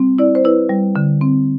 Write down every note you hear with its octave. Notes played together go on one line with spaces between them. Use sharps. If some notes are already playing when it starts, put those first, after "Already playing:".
Already playing: G3 C4
E4 D5
C5
E4 B4
G3
D3
C4